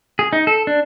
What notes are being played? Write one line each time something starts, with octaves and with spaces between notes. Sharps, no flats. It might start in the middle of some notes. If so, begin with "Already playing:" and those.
G#4
D#4
A4
D4